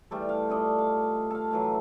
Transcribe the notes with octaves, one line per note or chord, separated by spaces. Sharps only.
E3 G3 A3 A4
F5
F4 A4 D5 D#5
F5
A4 F5
A2 E3 F#3